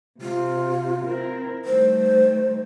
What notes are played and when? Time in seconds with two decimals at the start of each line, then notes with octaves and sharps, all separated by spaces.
0.22 C3 F4
1.05 C4 E4 A#4
1.65 D#3 G3 A3 C5